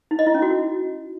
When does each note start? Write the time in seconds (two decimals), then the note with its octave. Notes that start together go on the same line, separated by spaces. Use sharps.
0.11 D#4
0.19 D#5
0.27 E4
0.34 C#4
0.42 F#4